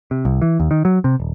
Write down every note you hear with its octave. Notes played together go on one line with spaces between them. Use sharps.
C3
C2
E3
D#2
D#3
F#3
C3
D#1